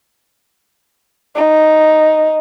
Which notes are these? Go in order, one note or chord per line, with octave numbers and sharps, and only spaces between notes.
D#4